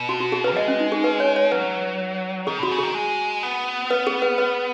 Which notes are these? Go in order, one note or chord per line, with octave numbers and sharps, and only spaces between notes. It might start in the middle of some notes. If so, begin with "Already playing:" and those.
Already playing: B2
F#4
F#4
G#4
B4
G#3 D#5
C#4
D#4
G#4
B4
C#5
C#5
F#3 B4
D#3 G#4
B2 F#4
C#3
D#3 G#4
G#3
B3
B4
G#4
B4
B4